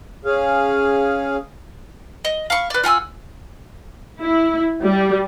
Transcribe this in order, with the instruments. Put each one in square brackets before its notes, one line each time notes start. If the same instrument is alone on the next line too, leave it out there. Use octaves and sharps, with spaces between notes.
[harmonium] C#4 G#4 F5
[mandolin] D#5
F5 B5 C#6
B4 D5
F4 F#5 G#5 E6
[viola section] E4
G3